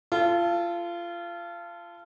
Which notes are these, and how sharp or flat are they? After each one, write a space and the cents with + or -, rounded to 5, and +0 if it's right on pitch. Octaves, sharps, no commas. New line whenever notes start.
F4 -25 A4 +0